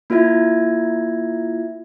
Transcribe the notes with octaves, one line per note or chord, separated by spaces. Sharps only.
A#3 E4 F4 E5 G#6